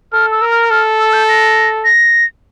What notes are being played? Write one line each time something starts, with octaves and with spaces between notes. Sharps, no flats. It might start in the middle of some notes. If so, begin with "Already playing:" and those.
A4 F6
E6
A#4
F6
A4 F6
E6
G6
A#6
A#6